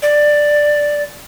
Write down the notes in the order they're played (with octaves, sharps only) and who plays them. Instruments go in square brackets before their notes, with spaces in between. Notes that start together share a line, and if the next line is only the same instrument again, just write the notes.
[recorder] D5